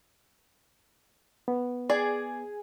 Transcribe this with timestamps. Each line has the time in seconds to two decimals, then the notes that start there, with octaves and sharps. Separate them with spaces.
1.48 B3
1.90 G#4 D5